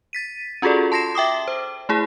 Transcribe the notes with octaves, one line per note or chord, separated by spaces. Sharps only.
A6 B6 D#7
C#4 F4 F#4 G#4 A4 D5
A5 C6 A#6 C7 E7
E5 G5 D6 D#6
C5
A3 E4 G#4